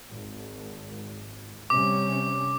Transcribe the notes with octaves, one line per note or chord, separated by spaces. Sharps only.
G#1
C3 G3 C#4 D6